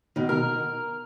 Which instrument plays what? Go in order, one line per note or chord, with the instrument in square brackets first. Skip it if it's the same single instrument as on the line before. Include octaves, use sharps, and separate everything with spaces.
[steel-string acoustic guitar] B2 D#3
[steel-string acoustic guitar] A#4 [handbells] F6